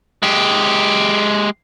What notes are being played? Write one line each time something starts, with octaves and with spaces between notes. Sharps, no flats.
G#3 G4